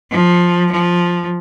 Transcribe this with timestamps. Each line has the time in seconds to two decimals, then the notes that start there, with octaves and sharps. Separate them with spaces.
0.12 F3
0.72 F3